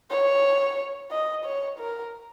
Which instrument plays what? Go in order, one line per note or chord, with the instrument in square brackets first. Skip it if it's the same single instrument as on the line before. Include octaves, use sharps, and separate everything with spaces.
[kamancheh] C#5
D#5
C#5
A#4